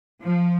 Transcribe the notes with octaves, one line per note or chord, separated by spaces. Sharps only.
F3